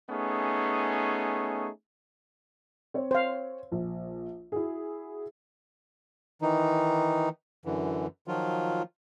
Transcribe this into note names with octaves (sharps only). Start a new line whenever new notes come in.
A3 B3 C#4 D#4 G#4
C4 C#5
C5 F5
A#1
E4 F#4 G#4
D#3 E3 D#4
F#2 D3 E3
D#3 F3 F#3 F4